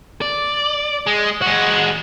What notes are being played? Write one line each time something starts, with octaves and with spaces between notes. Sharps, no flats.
D5
G#3
G#3 F#4 F#5